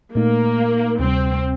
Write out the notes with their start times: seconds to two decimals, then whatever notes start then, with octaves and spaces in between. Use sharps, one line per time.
0.15 A#2 A3 A#3 D#4
0.99 D2 C3 G3 C4